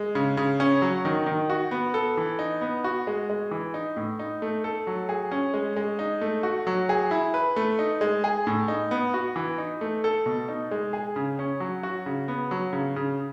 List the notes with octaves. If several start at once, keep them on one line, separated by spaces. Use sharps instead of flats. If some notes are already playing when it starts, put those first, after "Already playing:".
Already playing: G#3
C#3
C#3
C#4
F#3
D#3
D#3
F#4
B3
A4
E3
D#4
B3
F#4
G#3
G#3
E3
D#4
A2
D#4
A3
A4
F#3
G#4
C#4
G#3
G#3
D#4
A3
F#4
F#3
G#4
E4
B4
A3
D#4
G#3
G#4
A2
D#4
B3
F#4
E3
D#4
A3
A4
B2
D#4
G#3
G#4
C#3
C#4
F#3
F#4
C#3
B3
F#3
C#3
C#3